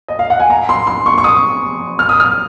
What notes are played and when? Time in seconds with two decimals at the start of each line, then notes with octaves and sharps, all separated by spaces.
0.08 D#5
0.19 F5
0.30 F#5
0.40 G#5
0.50 A#5
0.69 C6
0.87 C6
1.06 C#6
1.18 C#6
1.24 D#6
1.99 F6
2.09 D#6
2.20 F6